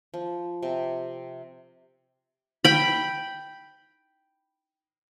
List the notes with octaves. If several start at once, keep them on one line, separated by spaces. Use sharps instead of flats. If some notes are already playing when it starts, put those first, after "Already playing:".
F3
C3
G5 B5